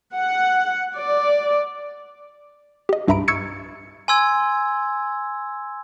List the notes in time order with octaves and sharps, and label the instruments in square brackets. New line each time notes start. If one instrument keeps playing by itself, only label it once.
[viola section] F#5
D5
[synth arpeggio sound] G4 D#5
C2 G2 E5 A#5 B5 D7
C#6 E6 G#6 A6 C#7 D7
[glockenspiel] G#5 C6 E6 G#6